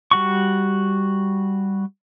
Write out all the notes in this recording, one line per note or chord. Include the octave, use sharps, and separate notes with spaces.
G3 F#4 C#6